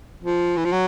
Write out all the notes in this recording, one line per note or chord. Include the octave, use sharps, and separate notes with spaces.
F3
E3
F3
F#3